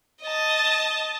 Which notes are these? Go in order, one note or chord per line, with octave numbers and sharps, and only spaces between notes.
D#5 A5